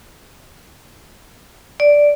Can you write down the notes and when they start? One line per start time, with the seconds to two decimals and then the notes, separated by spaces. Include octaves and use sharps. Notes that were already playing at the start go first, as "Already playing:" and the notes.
1.80 D5